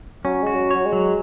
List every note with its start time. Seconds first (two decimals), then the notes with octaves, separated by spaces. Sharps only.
0.24 F#3 C#4
0.43 G#3 F#4
0.54 F#3
0.71 F#3 C#5
0.85 G#3
0.93 F#3